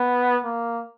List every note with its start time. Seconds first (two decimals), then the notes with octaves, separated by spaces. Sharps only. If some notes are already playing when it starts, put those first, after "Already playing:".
Already playing: B3
0.44 A#3